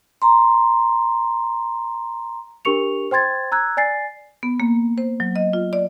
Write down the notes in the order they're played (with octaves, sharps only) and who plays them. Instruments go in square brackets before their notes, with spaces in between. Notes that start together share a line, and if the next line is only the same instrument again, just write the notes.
[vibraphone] A#5 C6
[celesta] D4 G4 A#4 C#6 C#7 F7
C5 G5 C6 G#6 A6
A#5 E6 F#6 G#6
D5 G#5 A6 C7
[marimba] B3
A#3
C5
F#3
D#5
F4
D5